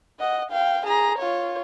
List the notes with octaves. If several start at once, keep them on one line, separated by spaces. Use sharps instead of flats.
D#5 F#5
F5 G5
G#4 A#5
F4 C#5